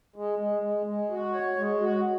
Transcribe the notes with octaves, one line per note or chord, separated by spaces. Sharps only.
G#3
G#3
G#3
G#3
F#4
C#5
G#3
F#4